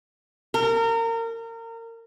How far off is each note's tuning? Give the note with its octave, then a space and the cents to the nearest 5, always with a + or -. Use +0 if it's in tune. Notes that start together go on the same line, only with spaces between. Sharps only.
A#4 -30